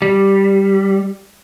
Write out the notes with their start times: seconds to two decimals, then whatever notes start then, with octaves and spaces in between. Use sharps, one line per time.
0.02 G3